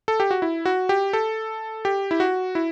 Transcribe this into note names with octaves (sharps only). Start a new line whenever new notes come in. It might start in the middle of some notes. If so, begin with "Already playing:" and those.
A4
G4
F#4
E4
F#4
G4
A4
G4
E4
F#4
E4